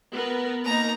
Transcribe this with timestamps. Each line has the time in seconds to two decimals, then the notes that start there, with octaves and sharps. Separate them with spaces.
0.11 B3 A#4 B4
0.65 A#3 D#4 A#5